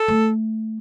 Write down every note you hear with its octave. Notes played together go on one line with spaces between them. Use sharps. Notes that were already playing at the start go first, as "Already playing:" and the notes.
Already playing: A4
A3